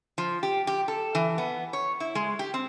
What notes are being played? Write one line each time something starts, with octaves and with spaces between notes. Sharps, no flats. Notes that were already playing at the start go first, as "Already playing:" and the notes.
F3
G4
G4
A4
E3
B3
C#5
E4
G#3
G4
C4